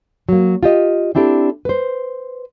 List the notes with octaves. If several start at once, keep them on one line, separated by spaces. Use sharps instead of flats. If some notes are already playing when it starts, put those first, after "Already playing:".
F#3 A#3
F4 G4 D#5
C4 D4 E4 G4 A4
B4 C5